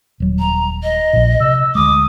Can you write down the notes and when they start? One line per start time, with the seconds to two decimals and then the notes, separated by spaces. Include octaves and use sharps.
0.20 D#1 F#3
0.39 A#5
0.83 D#5
1.13 A#1 A#2
1.40 C3 E6
1.75 D2 G#3 D6 D#6